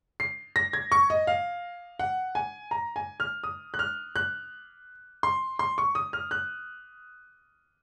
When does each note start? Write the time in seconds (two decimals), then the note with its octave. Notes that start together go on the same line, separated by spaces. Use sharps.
0.20 C7
0.56 A#6
0.73 G#6
0.92 C#6
1.10 D#5
1.27 F5
1.99 F#5
2.35 G#5
2.71 A#5
2.96 G#5
3.20 F6
3.44 D#6
3.74 F#6
3.79 F6
4.16 F#6
5.23 C6
5.59 C6
5.78 C#6
5.95 D#6
6.13 F6
6.31 F#6